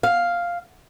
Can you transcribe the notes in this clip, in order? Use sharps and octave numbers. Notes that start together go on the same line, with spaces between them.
F5